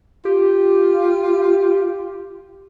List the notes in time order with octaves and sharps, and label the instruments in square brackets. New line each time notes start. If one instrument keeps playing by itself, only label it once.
[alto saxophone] F4 [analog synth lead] G4